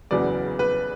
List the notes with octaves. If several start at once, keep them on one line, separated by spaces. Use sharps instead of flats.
F#1 E2 C#3 F#3 B3 D5
B4